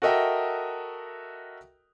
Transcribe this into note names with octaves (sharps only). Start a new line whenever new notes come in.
F#4 A4 A#4 D#5 E5 G5